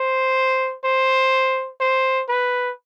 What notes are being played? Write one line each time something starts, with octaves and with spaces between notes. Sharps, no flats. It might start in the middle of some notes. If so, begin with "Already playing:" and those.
Already playing: C5
C5
C5
B4